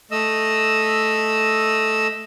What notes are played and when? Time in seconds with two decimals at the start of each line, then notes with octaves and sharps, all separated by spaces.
0.11 A3 D#5 E6